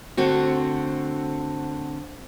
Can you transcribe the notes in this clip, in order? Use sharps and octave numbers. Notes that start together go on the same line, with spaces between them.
D3 A3 C4 F#4